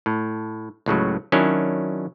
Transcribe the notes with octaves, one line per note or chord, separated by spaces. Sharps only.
A2
C#2 A2 C#3 F#3
D#3 F#3 C#4 D4 E4